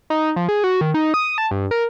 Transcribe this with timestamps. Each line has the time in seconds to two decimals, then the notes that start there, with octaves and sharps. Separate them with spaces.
0.10 D#4
0.36 F3
0.49 G#4
0.64 F#4
0.81 D#3
0.94 D#4
1.14 D#6
1.38 A5
1.51 G2
1.71 A#4